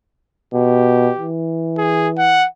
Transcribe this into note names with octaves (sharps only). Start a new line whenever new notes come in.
B2 G4
E3
G#4
F#5